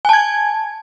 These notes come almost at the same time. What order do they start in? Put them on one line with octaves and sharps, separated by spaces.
G#5 A5 G#6